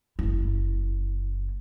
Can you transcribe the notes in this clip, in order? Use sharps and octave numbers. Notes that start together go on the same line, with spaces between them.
F#1 E4